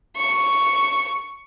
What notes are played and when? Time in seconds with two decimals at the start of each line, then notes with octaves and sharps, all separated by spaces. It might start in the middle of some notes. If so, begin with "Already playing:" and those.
0.17 C#6